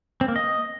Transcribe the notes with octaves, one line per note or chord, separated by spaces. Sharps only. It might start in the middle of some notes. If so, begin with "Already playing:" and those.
C4
A#3
D#5